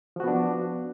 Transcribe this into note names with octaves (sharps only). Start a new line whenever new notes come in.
F3 B3 D4 F#4